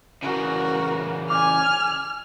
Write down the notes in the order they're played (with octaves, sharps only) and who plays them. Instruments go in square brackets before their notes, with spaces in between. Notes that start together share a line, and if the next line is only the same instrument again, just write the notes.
[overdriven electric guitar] C#3 E3 [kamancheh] F#4 A#4
[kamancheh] G#5 [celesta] D6 [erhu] F6